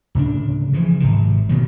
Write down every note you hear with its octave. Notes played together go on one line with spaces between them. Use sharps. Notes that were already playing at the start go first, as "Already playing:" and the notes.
D1 C#3 D4
C#3 E3 F3
G#1 C3
B2 D#3 F#3 G3